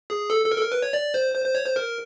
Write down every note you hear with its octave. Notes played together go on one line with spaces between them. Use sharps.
G#4
A4
A4
A#4
A4
A#4
B4
C#5
D5
C5
C5
C5
C#5
C5
A#4